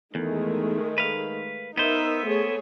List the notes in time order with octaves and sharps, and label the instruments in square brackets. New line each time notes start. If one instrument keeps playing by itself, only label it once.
[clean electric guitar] E2 [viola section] D#3 G#3 A3
[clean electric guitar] B4 F5
[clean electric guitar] B3 C5 [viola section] D#4 A#4 E5
[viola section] A3 G#4 C#5